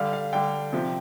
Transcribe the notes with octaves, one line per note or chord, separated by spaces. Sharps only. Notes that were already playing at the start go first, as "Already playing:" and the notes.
Already playing: D3 G3 F5
F5
D3 G3 G5
C3 F3